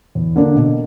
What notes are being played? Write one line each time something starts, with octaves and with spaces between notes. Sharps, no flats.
E2
D3 A#3 D4
B2